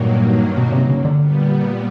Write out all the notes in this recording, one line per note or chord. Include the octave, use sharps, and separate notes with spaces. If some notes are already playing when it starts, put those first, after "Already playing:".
Already playing: G2 A#2 D#3 F#3 A#3
B2
C3
C#3
D3
A#2 G3 B3